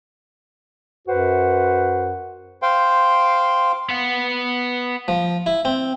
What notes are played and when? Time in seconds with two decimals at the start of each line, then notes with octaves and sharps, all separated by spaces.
1.07 F#2 F#4 B4 C5 F#5
2.62 C5 F5 G5 C6
3.89 B3 F#5
5.08 F3
5.46 E4
5.65 C4